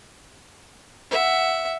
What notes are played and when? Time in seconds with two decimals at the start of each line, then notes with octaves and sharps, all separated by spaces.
1.11 E5 F#5